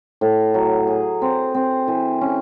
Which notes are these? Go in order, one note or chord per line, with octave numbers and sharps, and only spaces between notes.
A2
F#3
G#4
C4
C4
E3
C#4